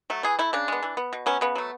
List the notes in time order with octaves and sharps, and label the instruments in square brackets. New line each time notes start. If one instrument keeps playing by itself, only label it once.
[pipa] F#3 A3
E3 G#4
A3 E4
C#3 D4
G#3 B3
E3
B3
B2
F#3 B3 C#4
C#3 B3
F#3 A3